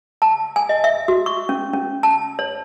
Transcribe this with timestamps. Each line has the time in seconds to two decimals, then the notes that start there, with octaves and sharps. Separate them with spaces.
0.22 A5
0.56 G#5
0.69 D#5
0.84 E5
1.08 F#4
1.26 C#6
1.49 C#4
1.73 C#4
2.03 A5
2.39 C#5